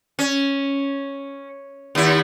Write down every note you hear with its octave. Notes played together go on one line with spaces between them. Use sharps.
C#4
D#2 E4